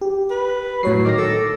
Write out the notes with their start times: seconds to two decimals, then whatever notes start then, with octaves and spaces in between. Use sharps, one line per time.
0.01 G4
0.31 B4
0.83 A2 F#3 C#5 C7
1.05 D#3 D6 A#6
1.18 A4